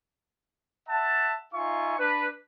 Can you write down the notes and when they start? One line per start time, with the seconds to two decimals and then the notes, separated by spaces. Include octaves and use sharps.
0.89 E5 F#5 A5
1.53 D#4 F4 E5 G#5 C#6
1.99 D4 B4